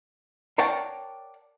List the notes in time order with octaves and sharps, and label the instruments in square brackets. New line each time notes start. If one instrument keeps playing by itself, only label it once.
[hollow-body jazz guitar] A#4 C#5 D5 F#5 G5 A5